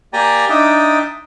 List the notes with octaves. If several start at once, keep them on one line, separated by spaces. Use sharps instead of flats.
A#3 G4 D5 G5 G#5 A#5
D4 D#4 E5 G5 D6 D#6